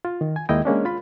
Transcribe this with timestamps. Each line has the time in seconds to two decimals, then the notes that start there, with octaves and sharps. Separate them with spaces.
0.05 F4
0.21 D#3
0.36 G#5
0.49 D#2 G#3 A#3 E4 D#5 G5
0.65 G#3 A#3 C#4 D4
0.85 F4 B5